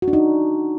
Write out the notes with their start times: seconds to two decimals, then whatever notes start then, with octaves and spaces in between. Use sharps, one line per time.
0.02 F#4
0.08 D4
0.13 D#4